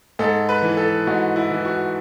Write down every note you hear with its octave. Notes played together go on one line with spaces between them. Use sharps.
G#2 A4
B4
E3
A4
G#2 F#4
E4
E3
F#4